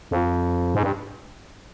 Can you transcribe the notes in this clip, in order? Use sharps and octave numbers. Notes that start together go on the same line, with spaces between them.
F2
G#2
G2